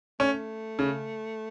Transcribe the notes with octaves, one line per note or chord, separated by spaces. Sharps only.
A3 C#4
C#3